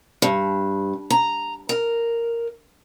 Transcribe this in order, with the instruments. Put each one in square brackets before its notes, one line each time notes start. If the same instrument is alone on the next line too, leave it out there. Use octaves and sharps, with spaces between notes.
[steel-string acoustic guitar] G2
A#5
A#4